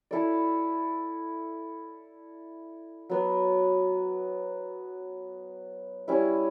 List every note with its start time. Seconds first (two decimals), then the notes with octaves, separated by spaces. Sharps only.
0.11 E4 A4 D5
3.09 F#3 B3 F#4
6.08 G3 C#4 E4